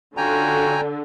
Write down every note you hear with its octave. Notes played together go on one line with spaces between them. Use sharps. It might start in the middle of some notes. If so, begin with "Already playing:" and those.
D3 C#4 F4 F#4 G5 G#5 A#5